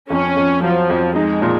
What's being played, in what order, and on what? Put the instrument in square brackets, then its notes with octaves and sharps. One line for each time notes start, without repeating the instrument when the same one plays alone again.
[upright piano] F2 [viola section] C#4
[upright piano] F2
[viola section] F3 [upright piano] F#3
[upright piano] F2
[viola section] G#3 [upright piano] D#4
[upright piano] A#2